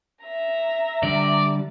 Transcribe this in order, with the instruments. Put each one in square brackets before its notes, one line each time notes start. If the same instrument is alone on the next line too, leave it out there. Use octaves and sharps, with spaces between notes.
[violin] E5 A#5
[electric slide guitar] D3 G3 [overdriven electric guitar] D5